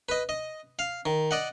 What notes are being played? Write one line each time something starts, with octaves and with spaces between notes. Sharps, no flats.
B4 D#5
D#5
F5
D#3
D5 D#5 F#5